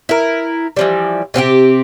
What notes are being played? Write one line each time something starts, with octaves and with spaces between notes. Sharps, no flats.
E4 A#4
E3 F3 G3
C3 C4 F4 G4